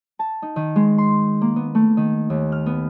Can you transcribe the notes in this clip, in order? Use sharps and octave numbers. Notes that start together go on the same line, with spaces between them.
A5
D#4
D#3
G#3
C6
A#3
B3
A3
D#3
D#2
F6
B3